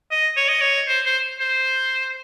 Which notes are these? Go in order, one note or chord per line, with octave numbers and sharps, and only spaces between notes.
D#5
C#5
D#5
C#5
C5
C5
C5